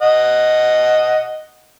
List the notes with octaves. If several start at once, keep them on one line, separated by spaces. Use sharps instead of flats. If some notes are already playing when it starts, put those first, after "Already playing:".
D#5 F#5